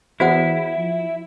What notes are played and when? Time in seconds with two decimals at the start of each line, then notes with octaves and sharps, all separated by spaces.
0.20 E2 E4 F#4 C5 F#5
0.77 F3